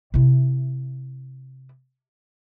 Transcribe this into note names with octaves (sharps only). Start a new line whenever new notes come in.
C3 E4